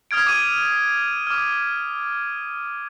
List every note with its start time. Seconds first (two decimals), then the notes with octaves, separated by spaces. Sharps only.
0.11 D#6 F6 G#6 D7
0.27 D6 D7 D#7
1.27 D6 F6